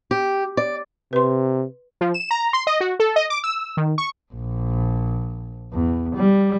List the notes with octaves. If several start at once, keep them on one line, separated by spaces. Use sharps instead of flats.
G4
D5
C3 B4 C6
F3
E7
A#5
C6
D#5
F#4
A4
D#5
D6
E6
D#3
C#6
A#1
E2
G3